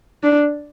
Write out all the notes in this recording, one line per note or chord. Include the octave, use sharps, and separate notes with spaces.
D4